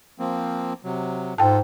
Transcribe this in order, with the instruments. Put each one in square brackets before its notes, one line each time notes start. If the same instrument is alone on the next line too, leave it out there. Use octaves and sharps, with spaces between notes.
[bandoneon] F3 A#3 C4
C3 F#3
[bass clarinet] G#2 [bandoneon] F4 A4 [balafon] G5 A5